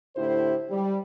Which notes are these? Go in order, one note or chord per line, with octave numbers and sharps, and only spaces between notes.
A2 D3 E4 G4 C5
G3